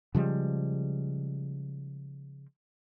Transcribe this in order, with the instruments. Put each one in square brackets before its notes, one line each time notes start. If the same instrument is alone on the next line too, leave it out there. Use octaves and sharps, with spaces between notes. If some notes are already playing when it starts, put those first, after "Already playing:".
[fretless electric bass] C#3 F3 G3 G#3